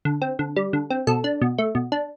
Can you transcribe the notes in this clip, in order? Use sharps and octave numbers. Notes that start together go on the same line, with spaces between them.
D3
C4
D3
G3
D3
C4
B2 A4
D4
B2
A3
B2
D4